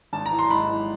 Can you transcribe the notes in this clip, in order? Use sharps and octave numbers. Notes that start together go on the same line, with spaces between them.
G#1 A5
A#5
E3
C6
G#2 B5
E3